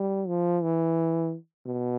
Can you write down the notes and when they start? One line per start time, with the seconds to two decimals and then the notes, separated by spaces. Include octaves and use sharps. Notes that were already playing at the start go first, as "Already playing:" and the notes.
Already playing: G3
0.28 F3
0.63 E3
1.66 B2